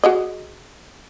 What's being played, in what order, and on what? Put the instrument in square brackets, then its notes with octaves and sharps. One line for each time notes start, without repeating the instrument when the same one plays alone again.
[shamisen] F#4 G#4 D#5